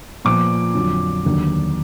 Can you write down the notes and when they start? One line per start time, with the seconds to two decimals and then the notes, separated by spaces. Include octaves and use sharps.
0.25 A#2 F3 B3 D6
0.74 F2 D3 F#3
1.25 D#2 D3 F#3